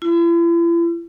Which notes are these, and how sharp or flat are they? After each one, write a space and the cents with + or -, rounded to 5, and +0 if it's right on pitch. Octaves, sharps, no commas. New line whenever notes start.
E4 +45